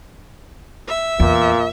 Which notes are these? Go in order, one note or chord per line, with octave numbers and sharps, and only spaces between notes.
E5
E2 A#2